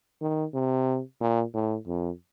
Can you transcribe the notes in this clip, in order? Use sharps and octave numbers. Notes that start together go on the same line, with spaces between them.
D#3
C3
A#2
A2
F2